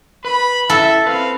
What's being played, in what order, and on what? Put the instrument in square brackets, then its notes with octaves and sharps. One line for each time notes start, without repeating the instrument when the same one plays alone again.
[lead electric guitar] B4 [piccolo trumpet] B5
[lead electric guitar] E4 [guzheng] A4 [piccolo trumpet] E5
[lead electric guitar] C4 B4 [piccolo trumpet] F5